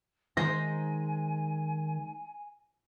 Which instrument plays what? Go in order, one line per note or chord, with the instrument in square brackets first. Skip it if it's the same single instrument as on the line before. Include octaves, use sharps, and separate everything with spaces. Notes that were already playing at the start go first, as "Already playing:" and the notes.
[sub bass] D#3 [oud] G#3 D#4 C5 [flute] G#5 [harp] A#6